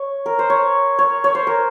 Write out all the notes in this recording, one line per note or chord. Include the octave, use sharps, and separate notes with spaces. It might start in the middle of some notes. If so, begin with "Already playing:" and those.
Already playing: C#5
A#4
C5
C#5
C#5
C#5
C5
A#4